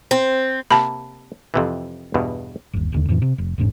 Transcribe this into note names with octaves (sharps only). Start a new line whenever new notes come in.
C4
C3 A#3 A5 B5
F2 C3 E3
E2 G2 B2
G1 D#2
E1 D#2 D3
F2 A2 E3
C3
F1
E1 A1 G#2 C#4